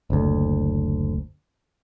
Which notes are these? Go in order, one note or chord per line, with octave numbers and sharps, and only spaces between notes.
F#1 D2